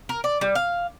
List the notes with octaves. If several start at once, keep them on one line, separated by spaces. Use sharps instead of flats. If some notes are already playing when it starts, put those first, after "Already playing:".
A#4
D5
G3
F5